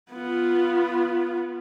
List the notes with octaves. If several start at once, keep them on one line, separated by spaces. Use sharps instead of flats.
B3 F4